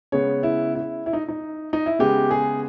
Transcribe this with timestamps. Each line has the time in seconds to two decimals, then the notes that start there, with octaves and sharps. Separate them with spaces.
0.12 C#3 G#3 B3 C#5
0.43 E4
0.75 E4
1.06 E4
1.13 D#4
1.28 D#4
1.73 D#4
1.86 E4
1.99 C#3 G#3 B3 G4
2.31 G#4